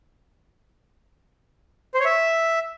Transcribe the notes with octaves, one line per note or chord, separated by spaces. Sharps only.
C5
C#5
E5